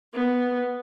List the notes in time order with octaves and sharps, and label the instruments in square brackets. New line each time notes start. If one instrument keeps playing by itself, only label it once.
[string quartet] B3